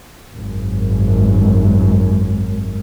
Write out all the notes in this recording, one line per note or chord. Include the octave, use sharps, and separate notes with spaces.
G#1 F#2